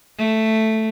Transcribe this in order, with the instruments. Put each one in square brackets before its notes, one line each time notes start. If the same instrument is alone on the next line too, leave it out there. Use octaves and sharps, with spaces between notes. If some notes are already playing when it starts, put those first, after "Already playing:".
[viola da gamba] A3